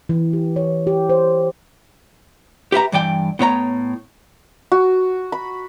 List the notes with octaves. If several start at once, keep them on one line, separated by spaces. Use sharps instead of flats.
E3
G4
C#5
G4
C5
G4 B4 E5 A#5
G2 E3 D5 G5
A2 B3 C#5 A#5
F#4
B5